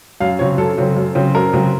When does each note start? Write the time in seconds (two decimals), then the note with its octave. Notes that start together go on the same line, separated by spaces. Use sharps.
0.20 F#2 F5
0.39 C#3 F#3 C4 C#5
0.58 F#2 A4
0.78 C#3 F#3 C4
0.96 F#2
1.15 C#3 F#3 C4
1.35 F#2 A#4
1.53 C#3 F#3 C4